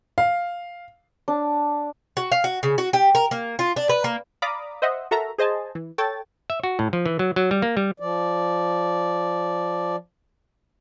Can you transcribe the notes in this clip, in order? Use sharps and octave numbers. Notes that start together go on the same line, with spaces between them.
F5
D4
F#4
F5
F#4
C#3
F#4
G4
A#4
A#3
F4
D4
B4
A#3
D5 F5 A#5 B5 D6 D#6
C5 D#5 E5 F#5
F#4 A4 A#4 E5 A#5
G#4 C5 D#5 G#5 A5
E3
A4 C#5 G5 A6
E5
F#4
A2
F3
E3
F#3
F#3
G3
A#3
G3
F3 D5